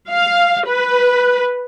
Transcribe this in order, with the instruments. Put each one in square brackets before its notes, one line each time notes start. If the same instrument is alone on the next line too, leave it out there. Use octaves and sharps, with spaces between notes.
[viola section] F5
B4